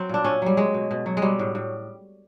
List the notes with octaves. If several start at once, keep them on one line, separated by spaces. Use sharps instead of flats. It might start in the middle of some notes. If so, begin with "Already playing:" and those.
Already playing: F#3 C4
A#2 D4
A#2 C#4
F#3 G3
F#3 G#3
B2
B2
F#3
G#3
F#3 G3
A2
A2